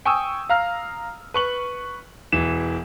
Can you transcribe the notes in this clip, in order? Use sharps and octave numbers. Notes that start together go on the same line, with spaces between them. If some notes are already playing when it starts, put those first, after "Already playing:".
G5 G#5 C#6 D#6 E6
F5 A#5 F6
B4 C#6 F#7
E1 E3 E7